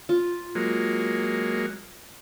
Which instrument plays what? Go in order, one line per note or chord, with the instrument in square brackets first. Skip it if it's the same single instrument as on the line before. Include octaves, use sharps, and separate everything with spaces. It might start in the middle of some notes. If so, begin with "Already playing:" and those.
[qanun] F4
[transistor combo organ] F#3 G#3 A#3